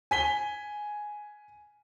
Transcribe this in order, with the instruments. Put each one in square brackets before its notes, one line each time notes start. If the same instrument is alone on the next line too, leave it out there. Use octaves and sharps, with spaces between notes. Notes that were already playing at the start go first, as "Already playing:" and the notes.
[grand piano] G#5 B6 G7